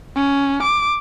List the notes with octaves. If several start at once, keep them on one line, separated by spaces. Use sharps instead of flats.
C#4
D6